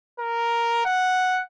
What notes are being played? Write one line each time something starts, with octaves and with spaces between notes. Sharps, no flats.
A#4
F#5